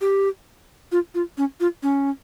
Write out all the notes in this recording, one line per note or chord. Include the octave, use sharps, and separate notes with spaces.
G4
F4
F4
C#4
F4
C#4